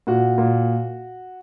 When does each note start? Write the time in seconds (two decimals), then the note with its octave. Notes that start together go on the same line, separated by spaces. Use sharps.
0.07 A#2 F#4
0.38 A#2